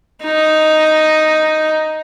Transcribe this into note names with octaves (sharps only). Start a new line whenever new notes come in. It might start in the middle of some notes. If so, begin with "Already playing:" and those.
D#4